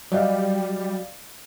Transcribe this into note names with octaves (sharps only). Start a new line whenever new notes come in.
F#3 G3 G4 D5 D#5 F5